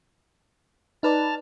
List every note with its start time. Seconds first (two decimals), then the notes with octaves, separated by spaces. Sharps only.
1.03 D#4 B4 D5 A5 F6